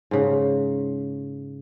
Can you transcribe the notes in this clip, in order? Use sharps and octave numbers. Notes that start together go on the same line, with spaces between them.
G#2 C#3